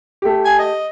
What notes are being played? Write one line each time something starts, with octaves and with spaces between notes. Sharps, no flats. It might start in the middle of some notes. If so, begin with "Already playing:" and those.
A3 G4
G#5
D#5